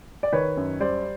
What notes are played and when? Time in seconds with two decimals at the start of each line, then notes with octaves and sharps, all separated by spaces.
0.23 D5
0.32 D#3 B4 C#5
0.57 F#2
0.80 G3 C5 D5